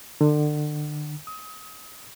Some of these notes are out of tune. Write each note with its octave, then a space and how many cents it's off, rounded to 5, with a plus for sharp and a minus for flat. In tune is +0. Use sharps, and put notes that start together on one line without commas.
D3 +30
D#6 +30